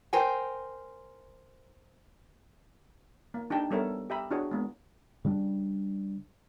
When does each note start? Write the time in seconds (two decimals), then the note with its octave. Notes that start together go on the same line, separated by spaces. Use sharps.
0.13 A#4 C5 G5 G#5
3.34 A#3
3.50 D4 D#4 G4 G5 A5
3.71 G3 B3 A4 A#4 C#5 E5
4.10 G4 D#5 E5 A#5 B5
4.31 D4 E4 F#4 G#4 C#5 D#5
4.51 G#3 A#3 B3
5.25 C#3 G3 A#3 D4